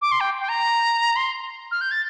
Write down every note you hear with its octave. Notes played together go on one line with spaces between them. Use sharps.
D6
C6
G5
G5
A#5
C6
F6
G6
A6